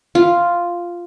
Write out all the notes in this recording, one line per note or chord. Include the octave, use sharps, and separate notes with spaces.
F4